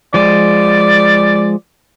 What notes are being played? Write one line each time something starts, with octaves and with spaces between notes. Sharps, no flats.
F3 G#3 D5